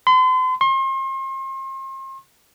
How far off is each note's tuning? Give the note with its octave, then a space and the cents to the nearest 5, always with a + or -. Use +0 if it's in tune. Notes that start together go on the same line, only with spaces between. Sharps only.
C6 -40
C6 +40